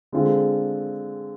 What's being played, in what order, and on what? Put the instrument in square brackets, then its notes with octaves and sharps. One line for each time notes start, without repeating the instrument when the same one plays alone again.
[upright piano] D3 G#3 C4 F4